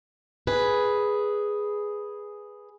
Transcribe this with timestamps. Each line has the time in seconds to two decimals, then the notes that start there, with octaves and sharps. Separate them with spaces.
0.47 G#4 B4